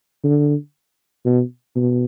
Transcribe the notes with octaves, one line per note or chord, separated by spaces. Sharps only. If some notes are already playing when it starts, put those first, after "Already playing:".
D3
B2
B2